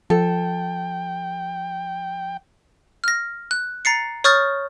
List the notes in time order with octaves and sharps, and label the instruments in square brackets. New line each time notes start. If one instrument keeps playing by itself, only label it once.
[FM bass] F3 [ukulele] A4 [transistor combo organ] G5
[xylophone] F6 A#6
F#6
A#5 A6 C7 C#7
C#5 C#6 D#6 F6 G6 A6